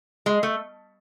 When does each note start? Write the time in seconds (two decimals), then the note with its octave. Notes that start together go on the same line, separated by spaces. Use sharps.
0.26 G#3
0.43 A3